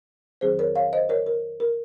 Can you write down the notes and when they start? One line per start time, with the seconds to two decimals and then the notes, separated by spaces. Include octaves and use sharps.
0.41 F2 D#3 F#3 C4 G#4 C5
0.59 A#4 C#5
0.76 C#5 F5
0.93 C5 D#5
1.09 A#4 C#5
1.27 A#4
1.60 A#4